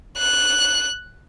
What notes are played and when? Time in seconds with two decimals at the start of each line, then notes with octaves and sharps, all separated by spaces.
0.18 F#6